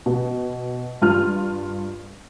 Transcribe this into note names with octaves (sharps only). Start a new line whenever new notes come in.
B2
G2 F4 F6